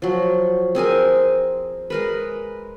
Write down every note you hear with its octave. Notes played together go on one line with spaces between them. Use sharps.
F3 F#3
C4 G#4 A#4 G#5
G#3 A#4 B4